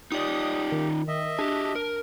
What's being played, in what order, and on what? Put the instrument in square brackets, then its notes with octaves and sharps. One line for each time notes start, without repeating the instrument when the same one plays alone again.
[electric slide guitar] D#4 F4 D5 [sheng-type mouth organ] G4 [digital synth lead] D#6
[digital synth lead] D#3
[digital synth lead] D#3 [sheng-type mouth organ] D#5 E5
[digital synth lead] D4 [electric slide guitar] G4 G#4
[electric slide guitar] A#4